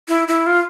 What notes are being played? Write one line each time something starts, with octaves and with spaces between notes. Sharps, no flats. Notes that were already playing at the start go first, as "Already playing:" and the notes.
E4
E4
F4